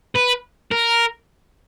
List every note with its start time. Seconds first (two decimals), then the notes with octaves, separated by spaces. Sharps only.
0.16 B4
0.72 A#4